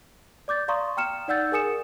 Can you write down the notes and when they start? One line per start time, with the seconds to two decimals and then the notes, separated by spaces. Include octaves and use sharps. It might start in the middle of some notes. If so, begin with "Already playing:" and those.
0.48 D5 D6 G6 A6
0.68 D5 F5 A#5 C6 C#6 D#6
0.97 G5 A#5 F6 C#7 E7
1.28 D#4 D5 F#5 E6 G6 A6
1.52 G#4 A#4 G#5 D#6 C#7 E7